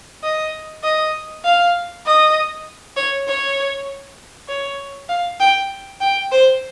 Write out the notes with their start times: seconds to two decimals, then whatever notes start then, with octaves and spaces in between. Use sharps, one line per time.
0.24 D#5
0.84 D#5
1.45 F5
2.06 D#5
2.96 C#5
3.27 C#5
4.48 C#5
5.09 F5
5.40 G5
6.01 G5
6.31 C5